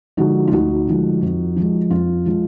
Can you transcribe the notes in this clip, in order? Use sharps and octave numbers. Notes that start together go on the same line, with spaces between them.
D3 F3 G#3 D#4 F#4
F4
D2 D#4 F#4
D3 F3 G#3
F2
F3 G#3
F2 F4
F3 G#3